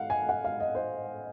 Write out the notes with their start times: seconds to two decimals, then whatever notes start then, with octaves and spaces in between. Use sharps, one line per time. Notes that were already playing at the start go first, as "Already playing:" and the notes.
Already playing: F5 F#5
0.10 G#5
0.29 F#5
0.44 F5
0.60 D#5
0.75 C5